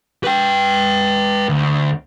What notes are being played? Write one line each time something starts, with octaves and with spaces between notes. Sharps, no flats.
B4 G5
D2